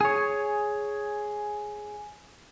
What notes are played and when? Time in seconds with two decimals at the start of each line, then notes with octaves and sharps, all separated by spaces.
0.01 G#4 C#5